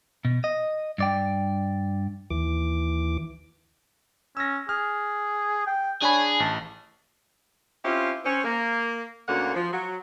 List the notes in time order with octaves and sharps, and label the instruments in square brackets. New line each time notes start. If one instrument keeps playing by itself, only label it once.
[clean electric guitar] B2
D#5
G2 D5 G5
[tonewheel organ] D#2 E3 D6
[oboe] C#4 [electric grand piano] E6 A#6
[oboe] G#4 [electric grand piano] F6
[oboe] G5
[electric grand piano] D4 G#5 B5 [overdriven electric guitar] G#4 [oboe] C#5
[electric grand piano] A1 [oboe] A5
[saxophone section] C4 C#4 E4 F4 G4
C4 C#4
A#3
D2 D3 A#3 C#4 F#5
F3
F#3